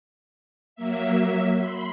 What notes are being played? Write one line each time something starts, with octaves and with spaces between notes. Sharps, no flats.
F#3 A#3 E5
B5 C6